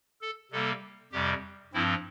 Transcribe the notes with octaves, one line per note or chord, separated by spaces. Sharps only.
A4
C3 G3 A#3 A4
F2 C3 G3 G4
G2 F3 C4 E4